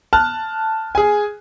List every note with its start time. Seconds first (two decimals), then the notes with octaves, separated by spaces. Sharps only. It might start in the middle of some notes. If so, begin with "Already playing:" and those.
0.13 A5 F6 F#6
0.95 G#4 G#5